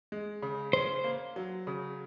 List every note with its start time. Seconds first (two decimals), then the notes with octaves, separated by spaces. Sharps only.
0.12 G#3
0.42 C#3
0.73 C#4 C5
1.04 A#3
1.36 F#3
1.67 C#3